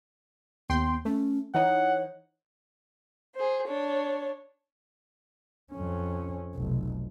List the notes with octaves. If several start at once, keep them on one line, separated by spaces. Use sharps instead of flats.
D#2 B3 G5 C6
A3 C#4
E3 D#4 C#5 F#5
G#4 C5
D4 C#5
F2 C#4
F1 B1